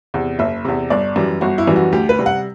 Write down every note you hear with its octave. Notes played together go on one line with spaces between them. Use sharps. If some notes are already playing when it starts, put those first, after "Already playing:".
E2 C3
F#1 E5
E2 C3
G1 D5
F#2 E3 G3
G1 F#4
E4
F#2 E3 G3
F#4
D2 G4
B4
C3 G3
F#5